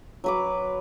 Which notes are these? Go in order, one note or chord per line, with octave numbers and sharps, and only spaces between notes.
F#3 B4 D6